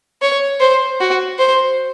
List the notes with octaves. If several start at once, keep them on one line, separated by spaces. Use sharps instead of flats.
C#5
C5
F#4
C5